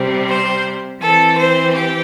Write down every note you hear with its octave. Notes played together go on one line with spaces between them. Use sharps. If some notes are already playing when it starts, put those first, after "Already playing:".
Already playing: C3 G3 C4
C5
E3 C4 A4
C5
G4